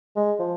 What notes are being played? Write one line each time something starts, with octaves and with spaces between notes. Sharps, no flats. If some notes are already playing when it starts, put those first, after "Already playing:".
G#3
F3